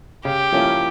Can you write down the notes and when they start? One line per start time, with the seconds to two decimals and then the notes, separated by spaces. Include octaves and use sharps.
0.25 C#3 G4
0.52 F3 A#3 C#4 E4